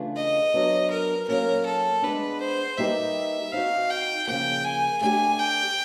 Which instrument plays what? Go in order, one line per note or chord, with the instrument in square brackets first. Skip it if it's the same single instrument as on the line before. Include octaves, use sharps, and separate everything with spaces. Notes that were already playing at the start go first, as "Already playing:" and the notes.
Already playing: [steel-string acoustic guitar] C#3 E3 A3 D4 F4
[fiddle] D#5
[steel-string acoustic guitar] F#3 B3 D4
[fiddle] A#4
[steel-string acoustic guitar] F#3 A#3 C#4 [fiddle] A#4
[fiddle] A4
[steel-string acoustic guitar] G#3 B3 D4 [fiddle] B4
[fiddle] C5
[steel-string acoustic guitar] G3 A#3 D#4 G4 B4 [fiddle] E5
[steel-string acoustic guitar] C4 D#4 F#4 [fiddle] F5
[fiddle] G5
[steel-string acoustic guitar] C#3 F3 A#3 [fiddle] G5
[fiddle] G#5
[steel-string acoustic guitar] A3 D4 G4 [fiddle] G#5
[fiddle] G5